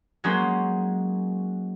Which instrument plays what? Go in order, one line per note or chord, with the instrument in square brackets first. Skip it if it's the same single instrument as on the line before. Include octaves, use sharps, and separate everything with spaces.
[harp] F#3 G#3 A#3 C#4 C5